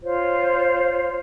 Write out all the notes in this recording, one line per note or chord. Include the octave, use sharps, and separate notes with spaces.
F4 C5 C#5